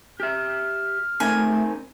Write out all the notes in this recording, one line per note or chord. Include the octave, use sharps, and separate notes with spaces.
G4 E5 F6
A3 C4 D#4 A#4 G#5